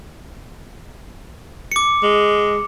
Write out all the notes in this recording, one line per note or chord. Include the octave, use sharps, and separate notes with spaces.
D6 C#7
G#3